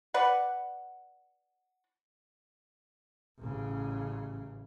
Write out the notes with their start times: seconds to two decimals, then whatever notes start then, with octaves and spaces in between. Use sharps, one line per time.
0.14 B4 D5 F#5
3.39 A1 C#3